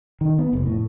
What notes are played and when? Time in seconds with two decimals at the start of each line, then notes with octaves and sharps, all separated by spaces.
0.21 D#3
0.39 B3
0.53 F1
0.66 A2